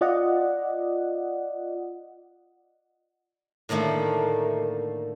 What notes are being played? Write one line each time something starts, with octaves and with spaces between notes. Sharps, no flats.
F4 D5 D#5 F#5
A2 D3 D#3 A3 A#3